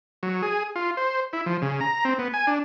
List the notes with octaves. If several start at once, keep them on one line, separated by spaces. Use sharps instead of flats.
F#3
G#4
F4
C5
E4
F3
C#3
A#5
C4
B3
G#5
D4